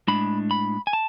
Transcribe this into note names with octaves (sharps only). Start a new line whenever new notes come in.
A2 G#3 D4 B5
B5
G#5
A5